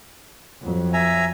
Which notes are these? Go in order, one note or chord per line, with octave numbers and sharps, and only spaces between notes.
F2 F#3
E5 G#5 A#5